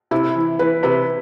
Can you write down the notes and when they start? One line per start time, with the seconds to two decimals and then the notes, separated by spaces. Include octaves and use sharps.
0.11 C3 E4
0.36 E3
0.59 E3 B4
0.83 C3 B4